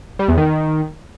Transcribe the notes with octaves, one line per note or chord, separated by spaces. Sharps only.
G3
E2
D#3